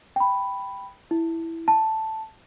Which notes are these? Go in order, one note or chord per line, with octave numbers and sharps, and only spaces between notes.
G5 B5
E4
A5